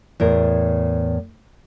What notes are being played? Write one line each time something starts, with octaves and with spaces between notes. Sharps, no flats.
E2 A2 A#4